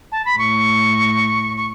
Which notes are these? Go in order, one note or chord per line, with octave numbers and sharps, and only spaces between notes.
A5
B5
A2 C#6
C#6